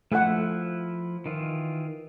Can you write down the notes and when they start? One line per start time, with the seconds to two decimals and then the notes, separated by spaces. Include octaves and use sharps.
0.12 F3 A3 E4 A4 F#5 F#6
1.26 D#3 E3 F4